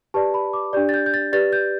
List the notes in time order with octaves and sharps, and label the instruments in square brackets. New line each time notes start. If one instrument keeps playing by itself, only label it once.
[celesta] G4 B4 D5 A5
B5
D6
D4 G4 D5 G6
A6
G6
G6
A6
G4 B4 D5 A6
G6